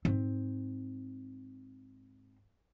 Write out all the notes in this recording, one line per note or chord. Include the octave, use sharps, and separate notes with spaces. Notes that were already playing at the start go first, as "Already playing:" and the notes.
G#2 C4